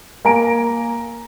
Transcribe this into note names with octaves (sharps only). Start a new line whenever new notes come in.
A#3 G#5 A#5 D7